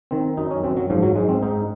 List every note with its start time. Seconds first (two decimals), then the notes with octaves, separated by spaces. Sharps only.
0.11 D#3 C4
0.37 F#2 D#4
0.51 C#4
0.64 F#2 C4
0.77 F#3
0.90 G#2 F3
1.02 F#3
1.16 G#2 G#3
1.29 C4
1.42 G#2 D#4